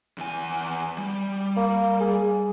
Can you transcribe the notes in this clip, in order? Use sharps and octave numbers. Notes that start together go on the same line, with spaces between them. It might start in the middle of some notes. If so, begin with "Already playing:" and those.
E2 G#5
G3
A#3
G#4